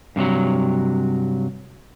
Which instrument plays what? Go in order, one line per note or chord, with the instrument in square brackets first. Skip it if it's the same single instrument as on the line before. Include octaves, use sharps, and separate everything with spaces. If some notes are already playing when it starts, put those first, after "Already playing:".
[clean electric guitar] G2 C3 F3 F#3